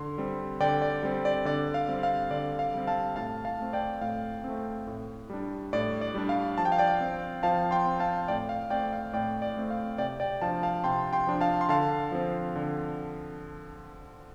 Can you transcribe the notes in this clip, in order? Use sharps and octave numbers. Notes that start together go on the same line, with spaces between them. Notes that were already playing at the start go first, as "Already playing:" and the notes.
Already playing: D3 C6
G3 C4
D3 D5 G5
D5
G3 C4
D5
D3 D5
F5
G3 C4
F5
D3 D5
F5
G3 C4
F5 A5
A2 F5 A5
F5 A5
A3 C4
D5 G5
A2 F5
A3 C4
A2
G3 D4
A2 D5
D5
G3 D4
F5
F3 A5
G5
F5
D5 G5
C4
F3 F5 A5
G5 C6
C4
F5 A5
A2 D5 G5
F5
A3 C4 D5 G5
F5
A2 D5 G5
D5
A3 C4
F5
C3 D5 G5
D5 G5
F3 D4 F5 A5
F5 A5
C3 G5 C6
G5 C6
F3 D4
F5 A5
C6
D3 F5 A5
F3 C4
D3